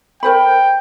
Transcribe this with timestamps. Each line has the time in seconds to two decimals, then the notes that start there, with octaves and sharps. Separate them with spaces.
0.23 A#4 C5 G5 B5